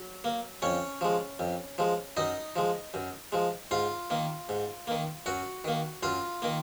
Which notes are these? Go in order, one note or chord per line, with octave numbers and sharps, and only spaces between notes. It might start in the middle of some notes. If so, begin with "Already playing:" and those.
Already playing: F#3
A#3
F2 C#4 C#5
F3 G#3
F2
F3 G#3
F#2 D#4 D#5
F3 G#3
F#2
F3 G#3
G#2 F4 F5
D#3 A#3
G#2
D#3 A#3
F#2 F#4 F#5
D#3 A#3
F#2 F4 F5
D#3 A#3